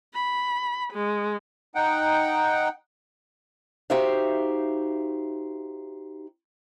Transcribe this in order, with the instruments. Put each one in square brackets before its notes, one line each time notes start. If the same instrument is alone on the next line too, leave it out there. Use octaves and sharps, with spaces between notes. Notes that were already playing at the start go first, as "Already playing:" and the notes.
[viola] B5
G#3
[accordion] D#4 F#5 G5
[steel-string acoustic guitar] D#4 F#4 G4 C5 E5 F5